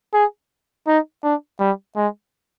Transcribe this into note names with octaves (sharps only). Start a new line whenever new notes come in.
G#4
D#4
D4
G3
G#3